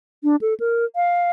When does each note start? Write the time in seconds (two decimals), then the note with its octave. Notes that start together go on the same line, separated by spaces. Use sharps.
0.24 D4
0.41 A4
0.60 A#4
0.96 F5